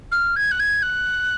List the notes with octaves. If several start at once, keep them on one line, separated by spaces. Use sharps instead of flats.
F6
G#6
F#6
G#6
F#6